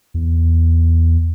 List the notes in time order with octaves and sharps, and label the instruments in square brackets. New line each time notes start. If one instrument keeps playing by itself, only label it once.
[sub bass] E2